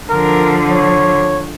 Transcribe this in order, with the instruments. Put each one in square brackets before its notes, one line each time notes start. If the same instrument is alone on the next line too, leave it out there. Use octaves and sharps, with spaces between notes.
[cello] D3 F3 [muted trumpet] A#4
[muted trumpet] C#5